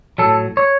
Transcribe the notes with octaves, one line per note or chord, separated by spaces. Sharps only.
A2 F#3 A4
C#5